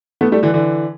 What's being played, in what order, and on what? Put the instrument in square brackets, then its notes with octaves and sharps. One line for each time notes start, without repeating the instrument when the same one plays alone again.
[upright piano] A3 B3
G3 A3
D3 E3
D3 E3